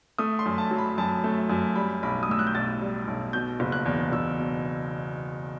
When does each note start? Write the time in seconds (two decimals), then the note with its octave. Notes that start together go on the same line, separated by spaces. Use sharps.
0.18 A3 D#6
0.39 C6
0.46 F#2
0.58 A5
0.71 F#3
0.78 B5
0.98 F#2 A5
1.24 A3
1.50 F#2
1.76 G3 B5
2.03 B1 B5
2.23 D#6
2.29 A2 E6
2.39 F#6
2.47 G6
2.55 B1 A6
2.81 G3
3.07 B1
3.33 B2 G6
3.60 F#1
3.72 F#6
3.86 E2
4.12 F#1 E6
4.38 B2